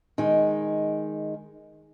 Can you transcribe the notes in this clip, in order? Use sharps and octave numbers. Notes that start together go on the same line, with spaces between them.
D#3 G#3